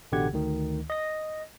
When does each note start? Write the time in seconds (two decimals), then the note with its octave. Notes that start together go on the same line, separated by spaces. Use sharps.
0.12 A1 B2 D3 G4 F#5 G#6
0.33 D2 D#3
0.90 D#5 A#6